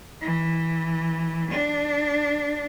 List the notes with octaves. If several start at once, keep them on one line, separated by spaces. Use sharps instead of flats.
E3
D4